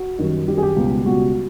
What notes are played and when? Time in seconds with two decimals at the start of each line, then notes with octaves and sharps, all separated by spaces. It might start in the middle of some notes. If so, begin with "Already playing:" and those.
Already playing: F#4
0.19 F#2 D#3 G3
0.48 F#2 D#3 G3 G4
0.57 G#4
0.63 G4
0.76 C#2 B2 G3
1.06 C#2 B2 G3 F#4